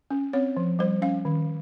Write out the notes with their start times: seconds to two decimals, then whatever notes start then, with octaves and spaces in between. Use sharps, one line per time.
0.11 C#4
0.33 C4 C#5
0.57 F3
0.79 G3 C5
1.02 C#4 F5
1.25 D#3